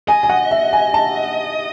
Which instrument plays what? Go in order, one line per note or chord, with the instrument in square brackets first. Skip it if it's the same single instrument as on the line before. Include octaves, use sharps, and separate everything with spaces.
[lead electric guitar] D#5 [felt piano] G#5
[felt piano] G#5
F#5
E5
G#5
A5